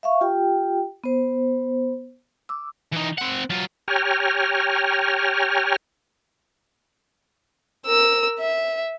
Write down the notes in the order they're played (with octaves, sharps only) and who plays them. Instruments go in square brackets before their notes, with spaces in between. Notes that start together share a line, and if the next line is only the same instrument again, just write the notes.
[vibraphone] E5 F5 C#6
F4 G4 G5
B3 C5
D6 E6
[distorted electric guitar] E3 D#4
C4 F#5
F#3 F4
[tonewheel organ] G4 C#5 G5 G#5 A#5 F6
[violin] A#4 E6
E5